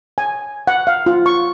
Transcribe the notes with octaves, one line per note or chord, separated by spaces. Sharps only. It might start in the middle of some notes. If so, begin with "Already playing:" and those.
G#5
F#5
F5
F4
C#6